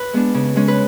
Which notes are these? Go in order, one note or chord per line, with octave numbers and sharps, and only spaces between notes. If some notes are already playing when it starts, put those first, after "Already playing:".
Already playing: B4
G#3 B3 D4
C#3
G#3 C#4
B4